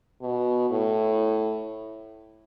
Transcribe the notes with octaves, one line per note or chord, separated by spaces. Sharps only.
B2
A2